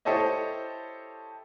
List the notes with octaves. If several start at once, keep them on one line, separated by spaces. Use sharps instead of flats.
E4 G4 A4 C5 C#5 D#5